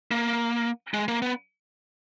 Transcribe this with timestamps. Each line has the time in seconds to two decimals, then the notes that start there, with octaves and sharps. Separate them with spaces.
0.11 A#3
0.94 G#3
1.08 A#3
1.22 B3